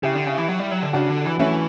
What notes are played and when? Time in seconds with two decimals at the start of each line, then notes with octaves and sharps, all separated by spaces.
0.03 C#3 E4 G4
0.15 D3
0.26 C#3
0.38 E3
0.49 F#3
0.60 G3
0.71 F#3
0.82 D3
0.93 C#3 D4 F#4
1.09 D3
1.24 E3
1.39 E3 A3 C#4